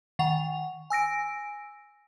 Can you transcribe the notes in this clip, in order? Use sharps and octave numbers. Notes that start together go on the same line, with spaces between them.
D#3 F#5 F7
G#5 E6 A#6 D7